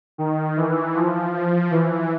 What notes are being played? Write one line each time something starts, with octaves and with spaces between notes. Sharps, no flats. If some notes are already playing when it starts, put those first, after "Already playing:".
D#3
E3
F3
F3
E3